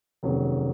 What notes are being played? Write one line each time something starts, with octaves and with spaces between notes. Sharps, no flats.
F1 D#2 C#3 F#3